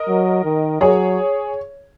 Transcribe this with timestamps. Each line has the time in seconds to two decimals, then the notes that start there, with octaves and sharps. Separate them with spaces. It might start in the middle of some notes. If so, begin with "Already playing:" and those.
Already playing: A#4 D#5
0.08 F#3
0.44 D#3
0.81 F#3 G#4 C#5